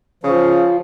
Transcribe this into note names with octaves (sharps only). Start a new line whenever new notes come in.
C#3 F3